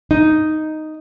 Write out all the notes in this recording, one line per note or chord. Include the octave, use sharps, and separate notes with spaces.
D#4